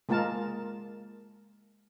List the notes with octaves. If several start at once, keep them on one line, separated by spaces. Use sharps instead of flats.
G#3 A#3 F4 A#4 A5